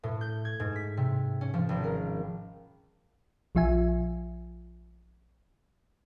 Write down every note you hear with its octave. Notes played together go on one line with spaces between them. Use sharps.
A2
G6
G#6
G#2
B6
C3
C#4
F3
G#1
A#4
A#1 F3 F4 E5 G#5